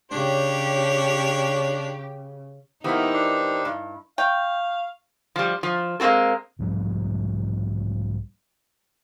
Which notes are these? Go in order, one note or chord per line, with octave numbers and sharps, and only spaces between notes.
C#3 D4 G4 C#5
E3 A#3 B3 D#4 G4 C5 E6
D4
G2
F5 G5 C#6
F3 G3
F3
G#3 A#3 C4 F#4 A4
B1 G#2 F3 G3